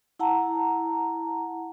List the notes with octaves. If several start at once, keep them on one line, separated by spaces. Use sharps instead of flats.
E4 F#5 A5 A#5